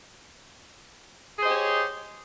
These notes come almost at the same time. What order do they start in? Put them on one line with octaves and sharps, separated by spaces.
G#4 C5 D#5 G4 C#5